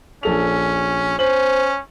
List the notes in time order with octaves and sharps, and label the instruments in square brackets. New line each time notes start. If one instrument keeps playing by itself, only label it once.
[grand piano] A#1 A4 F7 [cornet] C#4
[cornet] C#4 [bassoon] C5 [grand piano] F#7